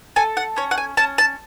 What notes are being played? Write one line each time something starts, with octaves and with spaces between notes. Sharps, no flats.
A4 G#5
F#5
C#4 C#5
F#5
G#5
C#4 A5
A5